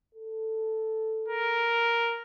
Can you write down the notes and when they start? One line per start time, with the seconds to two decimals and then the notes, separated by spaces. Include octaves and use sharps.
0.15 A4
1.28 A#4